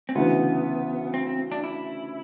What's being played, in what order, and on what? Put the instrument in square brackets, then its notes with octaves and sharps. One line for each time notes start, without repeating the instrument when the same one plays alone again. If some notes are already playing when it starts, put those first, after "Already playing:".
[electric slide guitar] C4
[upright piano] D2 C#3 E3 [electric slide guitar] B3
[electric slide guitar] C4
C4
D4
E4